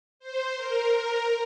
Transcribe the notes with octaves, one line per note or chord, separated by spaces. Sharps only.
C5
A#4
A#4